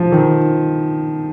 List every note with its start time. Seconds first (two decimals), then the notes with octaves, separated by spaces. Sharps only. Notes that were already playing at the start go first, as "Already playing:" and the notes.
Already playing: F3
0.12 D#3